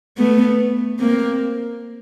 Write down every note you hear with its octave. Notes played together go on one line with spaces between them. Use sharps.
A3 B3
A#3 C4